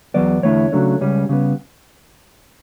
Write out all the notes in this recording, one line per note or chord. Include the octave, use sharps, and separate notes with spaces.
E2 B2 F#3 B3 D5
E2 D3 A3 E4 C#5
C#3 F#3 A3 D4
C#2 C#3 G3 C#4
C#3 G3 B3